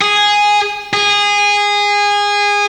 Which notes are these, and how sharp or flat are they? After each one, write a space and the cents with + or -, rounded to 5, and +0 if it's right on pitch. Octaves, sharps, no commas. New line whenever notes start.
G#4 -5
G#4 -20